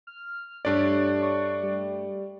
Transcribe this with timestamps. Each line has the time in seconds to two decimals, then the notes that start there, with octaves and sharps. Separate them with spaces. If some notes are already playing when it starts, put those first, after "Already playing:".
0.07 F6
0.65 G2 A3 D4 G4 C#5 D5
1.22 C#6
1.63 G3